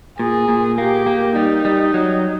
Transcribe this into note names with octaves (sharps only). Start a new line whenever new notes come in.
A#2 G#4
A#2
A#3 G4
A#3
G3 D#4
G3
F#3